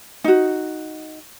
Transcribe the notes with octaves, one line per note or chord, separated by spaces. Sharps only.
D#4 F#4